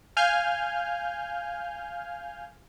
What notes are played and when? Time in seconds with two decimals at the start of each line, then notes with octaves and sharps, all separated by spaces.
0.17 F5 G#5 F6 G6